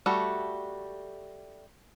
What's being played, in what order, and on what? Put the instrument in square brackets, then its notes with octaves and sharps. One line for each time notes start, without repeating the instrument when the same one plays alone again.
[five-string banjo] G3 A3 F#4 A4